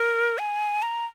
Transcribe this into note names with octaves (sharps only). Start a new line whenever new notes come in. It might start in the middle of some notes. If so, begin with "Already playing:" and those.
Already playing: A#4
G#5
A#5